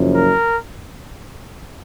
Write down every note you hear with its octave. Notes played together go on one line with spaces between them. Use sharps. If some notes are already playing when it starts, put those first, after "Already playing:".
Already playing: F#1 F#2 F3
A#4